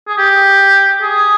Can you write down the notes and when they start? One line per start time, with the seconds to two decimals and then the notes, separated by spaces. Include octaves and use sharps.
0.08 G#4
0.18 G4
1.02 G#4